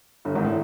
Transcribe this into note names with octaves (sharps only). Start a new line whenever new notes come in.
G1 G2
G#1 G#2
A2